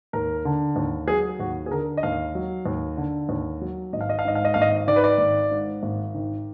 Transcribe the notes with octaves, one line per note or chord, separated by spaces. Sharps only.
D#2 A#4
D3
D#2
F#3 G#4
D#2 F#4
G#4
D3 A#4
D#5
D#2 F5
F#3
D#2
D3
D#2
F#3
G#1 D#5
F5
D#5
F5
G#2 D#5
F5
D#5
G#1 F5
D#5
D#3 D5
B4
D5
G#1
G#2
G#1
D#3